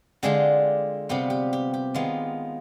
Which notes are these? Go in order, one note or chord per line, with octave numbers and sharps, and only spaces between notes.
D3 G#3 D4 F4 G4
C3 G3 B3 F4 G4
G4
G4
G4
D#3 G#3 B3 F4